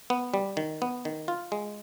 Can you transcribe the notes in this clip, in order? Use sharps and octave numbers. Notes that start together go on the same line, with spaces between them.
B3
G3
D#3
B3
D#3
F4
G#3